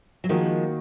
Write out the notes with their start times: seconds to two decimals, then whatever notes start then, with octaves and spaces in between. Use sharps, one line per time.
0.24 F#3
0.29 D#3 F3 G#3 A#3 D#4 F#4